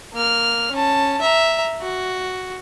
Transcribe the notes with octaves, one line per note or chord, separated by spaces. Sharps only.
A#3 F6
C#4 A5
E5 A#5
F#4